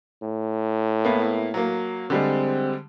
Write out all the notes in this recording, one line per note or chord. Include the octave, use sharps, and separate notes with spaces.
A2
A#3 B3 E4
F#3 A#3
D3 G3 G#3 C4